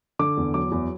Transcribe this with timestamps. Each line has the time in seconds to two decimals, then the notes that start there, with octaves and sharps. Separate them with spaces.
0.19 D3 D6
0.37 E2
0.54 F#3 D6
0.72 E2